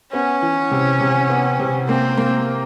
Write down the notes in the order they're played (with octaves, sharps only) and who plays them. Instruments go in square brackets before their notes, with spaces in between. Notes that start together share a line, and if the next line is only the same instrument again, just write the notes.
[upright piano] B3 [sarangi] C#4
[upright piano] E3
C3
C3
B3
C3
[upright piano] A#3 [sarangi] C4
[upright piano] A#3